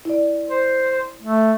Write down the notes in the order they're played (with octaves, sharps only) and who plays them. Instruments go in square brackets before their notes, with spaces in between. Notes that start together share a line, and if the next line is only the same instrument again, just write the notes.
[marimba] E4 D5
[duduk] C5
A3